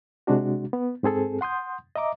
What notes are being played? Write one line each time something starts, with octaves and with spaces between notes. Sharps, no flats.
C3 G#3 D4 F#4
B3
G#2 C4 G#4 A4
F#5 C6 D#6 G6
D#5 E5 A#5 D6